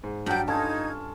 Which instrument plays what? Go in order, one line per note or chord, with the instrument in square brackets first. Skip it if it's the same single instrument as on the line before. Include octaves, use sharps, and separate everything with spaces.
[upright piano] G#2
[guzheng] G2 G3 [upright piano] F#3 F#4 [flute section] G5 A5 G6
[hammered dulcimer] C#4 F4 A4 [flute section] D#4 G#6 [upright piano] A5